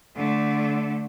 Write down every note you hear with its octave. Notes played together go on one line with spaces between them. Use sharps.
D3 A3